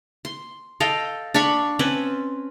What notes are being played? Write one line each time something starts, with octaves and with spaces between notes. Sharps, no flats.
C6
A4 D#5 F5 G5
D4 F5 B5 C#6
C4 C#4 B4 A5